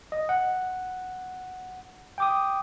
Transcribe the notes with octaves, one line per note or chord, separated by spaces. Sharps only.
D#5
F#5
G5 D6 D#6